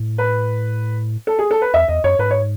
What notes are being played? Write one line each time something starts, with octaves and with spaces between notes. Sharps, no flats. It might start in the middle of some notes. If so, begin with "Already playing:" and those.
Already playing: A2
B4
A4
G#4
A4
B4
E2 E5
E2 D#5
F#2 C#5
G#2 B4
C#5